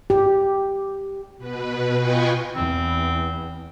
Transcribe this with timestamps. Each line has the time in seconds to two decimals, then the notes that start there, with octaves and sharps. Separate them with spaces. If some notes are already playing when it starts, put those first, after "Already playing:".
0.10 G4
1.38 B2 B4
1.98 F4 B4 D#5 G5 G#5 C#6
2.55 E2 C4